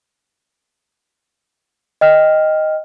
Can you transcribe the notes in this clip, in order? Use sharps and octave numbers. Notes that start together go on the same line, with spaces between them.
D#5 G5 F6